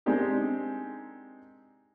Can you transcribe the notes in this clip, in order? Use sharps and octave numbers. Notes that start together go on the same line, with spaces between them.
G#3 C4 D4 D#4 G4 A#4